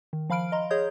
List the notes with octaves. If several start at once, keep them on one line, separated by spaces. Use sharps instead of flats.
D#3
F3 F5 B5 F6 D7
D#5 A#5 C6
G#4 C#5 D#5 D#6 G6 G#6